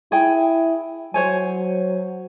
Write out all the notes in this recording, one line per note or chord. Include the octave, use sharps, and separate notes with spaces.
E4 G#4 G5
F#3 C5 C#5 G#5